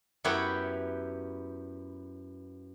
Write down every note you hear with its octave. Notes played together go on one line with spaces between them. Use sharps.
F#2 B3 E4 G4 B4 C#5